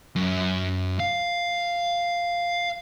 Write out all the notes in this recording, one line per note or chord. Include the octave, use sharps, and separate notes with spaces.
F#2
F5